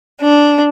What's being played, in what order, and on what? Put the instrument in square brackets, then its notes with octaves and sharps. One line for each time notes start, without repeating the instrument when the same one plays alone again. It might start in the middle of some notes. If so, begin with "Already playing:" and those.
[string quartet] D4